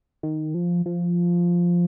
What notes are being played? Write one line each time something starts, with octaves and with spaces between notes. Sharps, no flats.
D#3
F3
F3